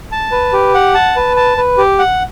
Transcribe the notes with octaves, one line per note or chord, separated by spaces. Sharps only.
A5
B4
G4
F#5
A5
B4
A5
B4
G4
F#5